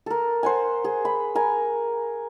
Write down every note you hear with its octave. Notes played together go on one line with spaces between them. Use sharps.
A4 A#4
C5 F#5 G#5
G#4
B5
A#4 G#5